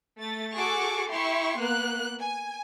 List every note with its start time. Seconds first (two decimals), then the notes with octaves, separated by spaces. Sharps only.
0.20 A3 A6
0.56 F#4 G#4 A4 G#5 C#6 D6
1.09 E4 G4 C6 C#6
1.61 A#3 B3 F#6
2.20 G#5